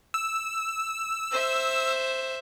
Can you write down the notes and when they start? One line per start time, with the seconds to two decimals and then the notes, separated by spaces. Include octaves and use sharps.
0.14 E6
1.32 C5 E5